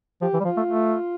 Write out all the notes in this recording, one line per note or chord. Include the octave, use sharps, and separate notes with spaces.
F3 G4
E3
G3
F3 F4
A3
A3